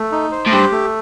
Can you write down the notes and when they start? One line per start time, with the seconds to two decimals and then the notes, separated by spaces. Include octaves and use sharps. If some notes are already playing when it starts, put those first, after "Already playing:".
Already playing: A3
0.12 D#4
0.32 C5
0.46 A2
0.52 G2 G4
0.72 A3